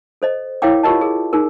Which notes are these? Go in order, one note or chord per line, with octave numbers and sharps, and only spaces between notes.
A4 C5 D#5
E4 A#4 C#5 F5 G5 D6
F4 G4 A#4 D#5 A5
G#4 A#4
D#4 G#4 A#4